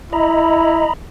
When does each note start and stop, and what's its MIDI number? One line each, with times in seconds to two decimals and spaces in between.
0.13 0.88 64
0.13 0.93 75
0.13 0.93 82
0.13 0.93 83